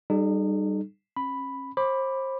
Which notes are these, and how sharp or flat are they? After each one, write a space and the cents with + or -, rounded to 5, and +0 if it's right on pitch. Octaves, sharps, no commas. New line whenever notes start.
G3 +0 D#4 -35 A4 -40
C#4 -40 B5 +0
C5 +30 B5 +0 D6 +0